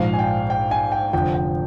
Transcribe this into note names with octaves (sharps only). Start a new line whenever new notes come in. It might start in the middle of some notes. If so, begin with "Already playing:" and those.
Already playing: A#1 G#2 F3 F5
G#5
G5
G5
G#5
G5
F1 F2 D3 F3 G5
G5